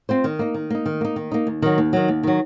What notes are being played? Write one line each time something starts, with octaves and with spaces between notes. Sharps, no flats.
C4 F4 C5
D#3
A#3 D#4
D#3
A#3 D#4
D#3
A#3 D#4
D#3
A#3 D#4
D#2
D#3 F#3
D#2
D#3 F#3
D#2
D#3 F#3